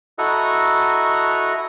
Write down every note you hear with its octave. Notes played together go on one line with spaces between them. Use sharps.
E4 F#4 A4 D#5 A#5 C#6